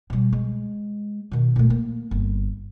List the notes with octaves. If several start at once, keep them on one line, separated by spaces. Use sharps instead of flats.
B2 G3
G#3
B2 D#3
A#2 A3
A#3
G1